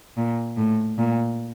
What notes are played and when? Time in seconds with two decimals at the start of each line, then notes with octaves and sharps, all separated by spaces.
0.17 A#2
0.57 A2
0.98 A#2